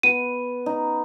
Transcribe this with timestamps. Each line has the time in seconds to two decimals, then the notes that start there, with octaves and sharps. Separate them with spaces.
0.03 B3 D#7
0.66 D#4